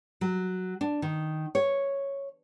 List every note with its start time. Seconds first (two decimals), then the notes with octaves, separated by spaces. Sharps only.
0.21 F#3
0.81 D4
1.02 D#3
1.55 C#5